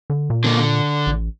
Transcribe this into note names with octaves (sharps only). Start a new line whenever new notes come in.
D3
A#2
D3 A#3
D3
A1